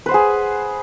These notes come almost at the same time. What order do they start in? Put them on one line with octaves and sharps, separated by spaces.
B4 C5 F#5 G#4